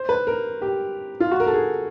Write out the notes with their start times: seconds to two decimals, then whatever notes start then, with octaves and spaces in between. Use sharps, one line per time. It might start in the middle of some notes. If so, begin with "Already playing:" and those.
Already playing: C5
0.09 B4
0.27 A#4
0.62 G4
1.20 F4
1.31 F#4
1.40 A#4
1.47 A4
1.54 G#4